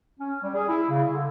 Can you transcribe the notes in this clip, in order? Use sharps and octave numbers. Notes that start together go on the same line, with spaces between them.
C#4
G3
G#4
E4
C#3
D3